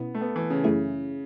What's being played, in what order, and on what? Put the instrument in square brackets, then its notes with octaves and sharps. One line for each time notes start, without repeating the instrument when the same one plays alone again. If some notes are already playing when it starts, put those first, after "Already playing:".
Already playing: [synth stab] B2 C#4 E4 [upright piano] B3
[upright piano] A3
B3
E3
C#3
[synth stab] F#2 E3 A3 E4 G#4